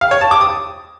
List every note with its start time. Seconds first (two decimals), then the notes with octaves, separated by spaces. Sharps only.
0.01 F5
0.11 C#5
0.21 A5
0.31 D6
0.41 D#6